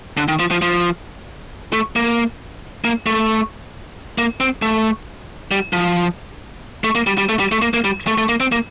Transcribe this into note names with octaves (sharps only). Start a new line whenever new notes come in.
D3
D#3
F3
F3
F3
A3
A#3
A#3
A3
A#3
C4
A3
G3
F3
A3
A#3
G3
G3
A3
G3
A3
A#3
A#3
G3
A3
A3
A#3
C4
A#3